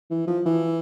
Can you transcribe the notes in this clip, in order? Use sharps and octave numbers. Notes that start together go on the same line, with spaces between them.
E3
F3
E3